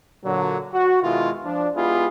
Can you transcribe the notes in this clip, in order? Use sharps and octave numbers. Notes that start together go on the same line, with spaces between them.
A#2 D3 F#3
F#4
B2 D#3 G#3 E4 F4
F3 D4
G#3 B3 E4 F4 G4 G#4